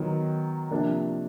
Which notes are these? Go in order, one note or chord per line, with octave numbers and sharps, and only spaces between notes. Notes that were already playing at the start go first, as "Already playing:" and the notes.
Already playing: D#3 F#3 B3 D#4
C3 F3 A#3 D4